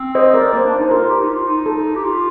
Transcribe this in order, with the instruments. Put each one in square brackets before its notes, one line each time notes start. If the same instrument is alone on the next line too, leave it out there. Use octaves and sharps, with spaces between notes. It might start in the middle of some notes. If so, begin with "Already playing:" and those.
Already playing: [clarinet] C4
[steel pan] C5 D#5
A#4 D5
[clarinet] A#3 [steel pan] C5
[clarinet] D4
[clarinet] D#4 [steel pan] C5
[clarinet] F4 [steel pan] A#4
[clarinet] G4
D#4
F4
D#4
[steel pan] A4
[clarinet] G4
F4